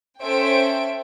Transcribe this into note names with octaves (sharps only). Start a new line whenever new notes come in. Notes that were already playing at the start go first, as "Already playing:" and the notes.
C#4 A4 C5 E5 G5 D7